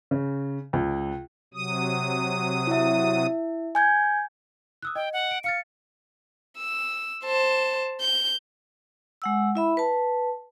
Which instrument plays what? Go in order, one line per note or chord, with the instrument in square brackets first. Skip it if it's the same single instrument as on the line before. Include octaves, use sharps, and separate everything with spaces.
[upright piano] C#3
C#2
[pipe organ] C3 F#3 D#6
[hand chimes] E4 E5
G#5 G6 G#6
[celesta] D#6 E6 F#6
[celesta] D#5 [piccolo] G5
[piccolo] F#5
[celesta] D7
[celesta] F5 F6 A6 [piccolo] C#7
[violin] E6
C5 A5
G6
[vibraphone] G#3 F#5 E6
E4 E5 B5
B4 A5